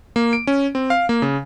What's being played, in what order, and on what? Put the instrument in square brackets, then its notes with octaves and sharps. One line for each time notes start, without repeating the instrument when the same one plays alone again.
[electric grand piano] A#3
D7
C#4
C4
F5
A#3
C#3